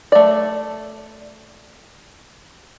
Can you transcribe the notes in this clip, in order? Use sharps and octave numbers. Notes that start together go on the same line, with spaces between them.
A3 D5